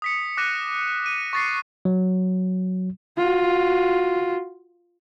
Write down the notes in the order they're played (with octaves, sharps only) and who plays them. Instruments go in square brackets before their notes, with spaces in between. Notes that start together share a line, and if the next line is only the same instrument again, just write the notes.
[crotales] D#6 B6 C#7
D6 F#6 A#6 D#7 E7
D#7
C#6 D#6 A6 A#6 C7 C#7
[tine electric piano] F#3
[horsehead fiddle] F4 F#4